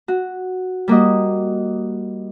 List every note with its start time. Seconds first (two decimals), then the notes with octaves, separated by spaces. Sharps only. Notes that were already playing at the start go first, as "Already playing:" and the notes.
0.08 F#4
0.88 G3 A#3 F#4 D#5